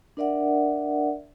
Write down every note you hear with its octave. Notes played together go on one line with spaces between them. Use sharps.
D4 A#4 D5 E5 F#5